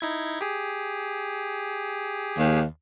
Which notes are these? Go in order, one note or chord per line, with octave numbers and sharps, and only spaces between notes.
D#4 E4 G#6
G4 G#4
D#2